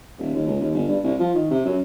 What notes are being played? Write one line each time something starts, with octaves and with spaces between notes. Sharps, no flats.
D#1
D#2
C#2
D#2
G1
G2
C2
F3
D#3
C3
F#2